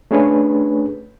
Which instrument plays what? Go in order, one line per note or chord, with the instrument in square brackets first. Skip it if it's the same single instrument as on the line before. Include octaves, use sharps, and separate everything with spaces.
[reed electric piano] A3 C#4 D4 G#4 B4 C#5